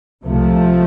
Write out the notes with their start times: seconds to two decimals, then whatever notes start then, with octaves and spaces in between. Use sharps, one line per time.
0.24 C2 C3 F3 A3